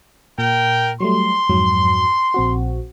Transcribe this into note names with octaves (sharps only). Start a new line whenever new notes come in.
A#2 A#4 G5
F#3 G3 A3 C6
F2 G#2 F#3
A#1 C4 F#4